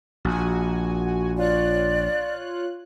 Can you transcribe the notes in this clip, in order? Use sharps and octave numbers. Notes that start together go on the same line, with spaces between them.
A#1 F#4 G#5
F4 C#5 D5 F#6